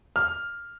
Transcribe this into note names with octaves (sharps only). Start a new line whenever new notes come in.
F6